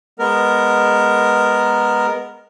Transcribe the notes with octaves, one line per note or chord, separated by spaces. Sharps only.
G#3 B3 A#4